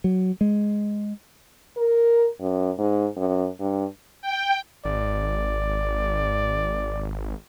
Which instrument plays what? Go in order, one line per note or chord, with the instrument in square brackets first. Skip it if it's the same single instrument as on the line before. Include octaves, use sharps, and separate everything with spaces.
[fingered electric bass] F#3
G#3
[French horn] A#4
F#2
G#2
F#2
G2
[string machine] G5
[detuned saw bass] G#1 [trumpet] D5